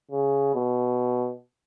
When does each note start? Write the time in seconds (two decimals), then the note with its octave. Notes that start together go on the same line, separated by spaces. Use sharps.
0.11 C#3
0.54 B2